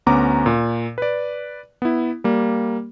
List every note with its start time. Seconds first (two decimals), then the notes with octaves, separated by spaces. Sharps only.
0.06 D2 B3 C#4 A#5 D6
0.46 A#2
0.98 B4 D5
1.82 B3 E4
2.24 G3 A#3